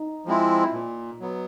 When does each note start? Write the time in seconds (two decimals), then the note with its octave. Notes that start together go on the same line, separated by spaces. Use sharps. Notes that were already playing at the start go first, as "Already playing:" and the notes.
Already playing: D#4
0.26 F3 G#3 C4 E4
0.73 A#2
1.20 F#3 B3